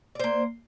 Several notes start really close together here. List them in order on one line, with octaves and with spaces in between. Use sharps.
D5 C5 A#3